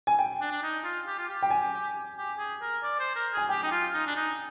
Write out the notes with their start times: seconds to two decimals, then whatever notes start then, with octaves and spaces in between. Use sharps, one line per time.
0.07 G#5
0.19 G5
0.41 D4
0.52 D4
0.63 D#4
0.84 F4
1.07 G4
1.19 F4
1.29 G4
1.42 G5
1.50 G#5
2.18 G4
2.39 G#4
2.62 A#4
2.83 D5
3.00 C5
3.16 A#4
3.33 G#4 G#5
3.49 G4 G5
3.63 D#4
3.72 F4
3.94 D#4
4.07 D4
4.16 D#4